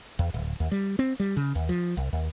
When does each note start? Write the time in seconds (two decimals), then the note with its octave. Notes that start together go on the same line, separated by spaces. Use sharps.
0.19 E2
0.34 D1
0.60 D#2
0.72 G3
0.99 C4
1.20 G3
1.37 C#3
1.55 D#2
1.69 F3
1.97 C2
2.13 D#2